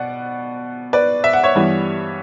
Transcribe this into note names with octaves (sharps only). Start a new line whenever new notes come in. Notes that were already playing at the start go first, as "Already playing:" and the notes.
Already playing: B2 D5 F#5
B4 D5
E5
F#5
C#5 E5
G2 E3 G3 B3